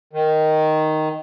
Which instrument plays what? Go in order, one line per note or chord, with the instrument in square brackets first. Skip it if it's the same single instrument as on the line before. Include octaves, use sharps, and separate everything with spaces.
[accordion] D#3